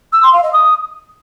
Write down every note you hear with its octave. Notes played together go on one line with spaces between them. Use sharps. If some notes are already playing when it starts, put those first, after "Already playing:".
E6
C6
F5
D#5
D#6